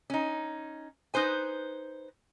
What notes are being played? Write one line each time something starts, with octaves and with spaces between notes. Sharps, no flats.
C#4 D#4
D#4 B4 C5 G#5